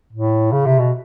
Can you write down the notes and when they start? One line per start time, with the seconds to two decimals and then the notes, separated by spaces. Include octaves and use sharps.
0.13 A2
0.52 C#3
0.66 C3
0.79 B2